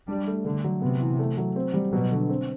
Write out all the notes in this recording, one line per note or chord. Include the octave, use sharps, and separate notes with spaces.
G3 D4
A3
D3 A3
F#3
C3 B3
E3
A3
F#3
C4
G3
B2 F#3
D3
C4